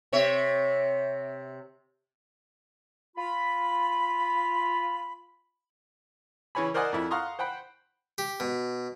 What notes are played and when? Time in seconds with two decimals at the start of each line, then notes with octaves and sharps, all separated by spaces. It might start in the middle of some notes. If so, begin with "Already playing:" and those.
0.13 C3 C#5 E5
3.17 F4 B5
6.55 C#3 E3 C#5 G#5 B5
6.74 A#4 C5 D5 D#5 F#5 G#5
6.92 F2 E4
7.11 F5 F#5 A#5 C6 C#6 D#6
7.39 C5 F#5 G5 B5
8.18 G4
8.40 B2